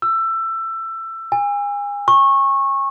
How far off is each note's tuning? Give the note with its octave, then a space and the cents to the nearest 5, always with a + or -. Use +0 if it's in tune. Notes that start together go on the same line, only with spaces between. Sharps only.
E6 +20
G#5 -35
C#6 -20